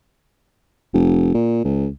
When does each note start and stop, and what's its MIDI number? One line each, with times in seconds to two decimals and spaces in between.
0.93 1.29 29
1.34 1.61 46
1.64 1.88 37